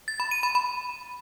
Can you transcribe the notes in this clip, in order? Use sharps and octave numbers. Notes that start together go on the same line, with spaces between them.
A6
B5
D#7
B5
B5